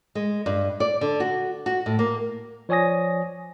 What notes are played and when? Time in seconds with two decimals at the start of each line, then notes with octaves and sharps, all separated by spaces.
0.15 G#3
0.46 G2
0.80 D5
1.01 D3
1.20 F#4
1.66 F#4
1.86 A2
1.99 A#3
2.69 F3 C#5 D5 G#5 D#6 A#6